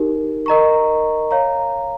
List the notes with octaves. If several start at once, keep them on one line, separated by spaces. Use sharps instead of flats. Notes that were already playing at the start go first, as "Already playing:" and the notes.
Already playing: D#4 G4 A#4
A#4 D#5 A#5 C#6
C#5 F5 A#5